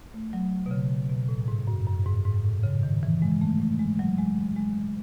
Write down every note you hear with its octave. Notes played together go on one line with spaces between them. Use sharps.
A3
F#3
B2
C#3
B2
A2
G#2
F#2
F#2
G#2
G#2
A2
C#3
D#3
E3
G#3
A3
A3
G#3
F#3
G#3
G#3